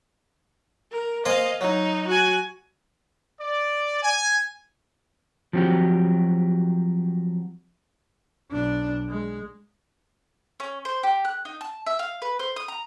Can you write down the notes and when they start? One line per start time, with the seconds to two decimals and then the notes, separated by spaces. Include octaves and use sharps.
0.92 A#4
1.25 A#3 C5 D#5 F5 G#5
1.61 F#3 D#4
2.07 F#4 G#5
3.41 D5
4.03 G#5
5.53 F3 F#3 C4 F#4 G4
8.50 B1 D4
9.09 G#3
10.60 C#4
10.85 C5
11.03 G4
11.25 F#6
11.45 D#4
11.61 A5
11.86 E5
11.99 F5
12.22 B4
12.39 C5
12.56 D#6
12.68 A#5